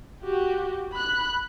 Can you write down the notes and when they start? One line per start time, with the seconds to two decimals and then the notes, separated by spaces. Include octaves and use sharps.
0.23 F#4 G4
0.93 B5 F#6